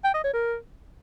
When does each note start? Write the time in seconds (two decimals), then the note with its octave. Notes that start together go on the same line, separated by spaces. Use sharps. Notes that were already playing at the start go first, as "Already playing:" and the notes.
0.04 G5
0.14 D#5
0.24 C#5
0.34 A#4